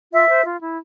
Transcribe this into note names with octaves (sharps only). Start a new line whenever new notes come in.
F4 E5
C5
F4
E4